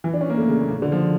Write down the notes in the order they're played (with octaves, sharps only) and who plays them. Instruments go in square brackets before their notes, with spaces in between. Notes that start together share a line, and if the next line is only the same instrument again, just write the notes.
[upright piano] E3
D4
C#4
A#3
A3
C#3
A#2
C#3
D3
F3